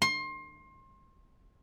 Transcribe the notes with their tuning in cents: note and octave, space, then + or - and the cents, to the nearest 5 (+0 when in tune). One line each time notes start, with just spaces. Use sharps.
C6 +30